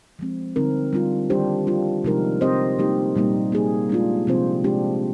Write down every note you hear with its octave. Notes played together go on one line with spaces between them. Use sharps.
F3 G#3 C4
D3 G3 C4 D#4 A#4
G3 D4 F4
D#3 G3 D4 G4 C5
G3 D4 F4
C3 F3 G#3 D#4 A#4
C4 G4 C5 D#5
G3 A#3 D#4 G4
A#2 G3 A#3 D#4
A#3 D#4 G#4
G#3 D4 F4
C3 F3 C4 F4 C5
G#3 D4 G4